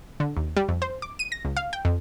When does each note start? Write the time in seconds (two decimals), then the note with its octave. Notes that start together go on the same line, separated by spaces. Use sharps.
0.20 D3
0.37 D#2
0.57 G3
0.68 F2
0.82 C5
1.02 D6
1.19 D#7
1.32 A#6
1.45 C#2
1.57 F5
1.73 G5
1.85 F2